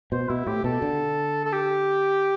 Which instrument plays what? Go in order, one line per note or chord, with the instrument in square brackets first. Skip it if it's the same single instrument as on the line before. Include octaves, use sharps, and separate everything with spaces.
[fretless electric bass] B2 [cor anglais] C5
[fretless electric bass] B2 [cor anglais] E4
[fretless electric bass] A2 [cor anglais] G4
[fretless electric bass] B2 [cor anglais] A4
[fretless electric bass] D3
[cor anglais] A4
G4